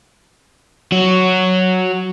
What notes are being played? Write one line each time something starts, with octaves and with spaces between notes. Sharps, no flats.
F#3 F#4